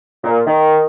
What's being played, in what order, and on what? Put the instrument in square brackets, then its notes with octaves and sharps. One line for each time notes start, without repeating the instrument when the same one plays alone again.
[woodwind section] A#2
D#3